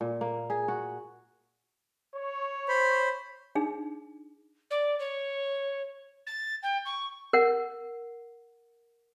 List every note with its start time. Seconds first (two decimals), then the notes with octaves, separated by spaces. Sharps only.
0.01 A#2
0.21 A#3
0.50 G#4
0.68 F#4
2.15 C#5
2.68 C5 B5
3.55 D4 D#4 G#4
4.70 D5
4.99 C#5
6.26 A6
6.63 G5
6.85 C#6
7.33 A#4 F#5